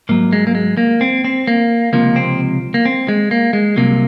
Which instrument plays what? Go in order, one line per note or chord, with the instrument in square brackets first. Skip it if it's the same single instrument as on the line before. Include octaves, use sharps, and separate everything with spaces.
[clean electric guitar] G#2 F#3 A#3
G#3
A#3
G#3
A#3
C4
C4
A#3
C#2 C3 F3 A#3
C4
A#3
C4
G#3
A#3
G#3
C2 C3 F#3 A#3